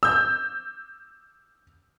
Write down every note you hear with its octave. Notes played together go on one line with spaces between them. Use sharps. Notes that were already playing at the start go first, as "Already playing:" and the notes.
E6 G6